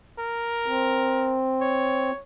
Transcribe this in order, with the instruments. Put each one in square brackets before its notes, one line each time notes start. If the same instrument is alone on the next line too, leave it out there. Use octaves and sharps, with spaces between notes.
[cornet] A#4
[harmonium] C4
[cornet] C#5